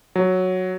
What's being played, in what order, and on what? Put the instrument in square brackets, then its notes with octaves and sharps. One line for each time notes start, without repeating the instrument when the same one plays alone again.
[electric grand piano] F#3